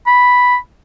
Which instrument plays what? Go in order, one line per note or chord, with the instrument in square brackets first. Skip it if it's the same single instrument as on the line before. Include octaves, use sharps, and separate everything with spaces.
[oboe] B5